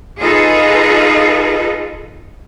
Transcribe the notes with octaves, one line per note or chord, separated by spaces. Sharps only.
D#4 F4 G#4 A4 B4 D#5